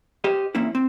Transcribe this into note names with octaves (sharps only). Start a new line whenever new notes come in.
G4 C5 D#5
E2 A#3 C4 C#4 E4
C4